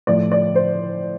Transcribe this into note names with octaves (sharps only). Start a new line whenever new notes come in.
A2 F3 D5
D5
C5